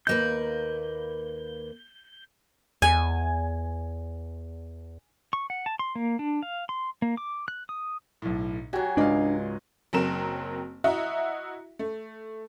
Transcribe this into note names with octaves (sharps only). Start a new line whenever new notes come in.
D#2 A#3 B4 G6
E2 G#5
C#6
F#5
A5
C6
A#3
D4
F5
C6
A#3
D6
F#6
D#6
B1 A2
F#3 F#4 G4 G#5
C#2 G#2 D4 D5 D#5 F5
F#1 F#3 C4 A#4 E7
E4 F#4 D#5 E5 A#5
A3